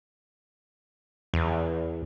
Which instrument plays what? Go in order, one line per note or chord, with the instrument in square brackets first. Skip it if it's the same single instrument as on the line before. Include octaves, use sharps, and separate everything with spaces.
[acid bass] E2